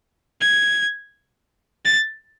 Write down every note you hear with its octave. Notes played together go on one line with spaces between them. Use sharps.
G#6
A6